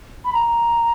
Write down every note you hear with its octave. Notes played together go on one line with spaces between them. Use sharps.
B5
A#5